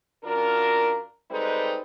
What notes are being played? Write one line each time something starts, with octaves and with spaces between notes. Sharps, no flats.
F#2 D4 F4 A#4
G3 G#3 C4 D#4 A4 B4